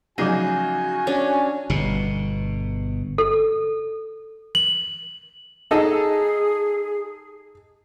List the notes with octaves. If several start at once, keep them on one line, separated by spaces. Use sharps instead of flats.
C#3 F3 F#3 A3 D#4 F#4 G#4 G#5
C#4 D4
G1 B2
A4
F#7
D#4 G#4 A4 D#5